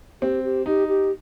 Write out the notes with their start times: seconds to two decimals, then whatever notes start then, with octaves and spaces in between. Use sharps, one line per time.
0.22 C4 G4
0.44 G4
0.66 D#4 G4
0.88 G4